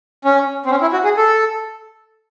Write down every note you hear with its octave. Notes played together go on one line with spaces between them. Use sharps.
C#4
C4
C#4
E4
F#4
G#4
A4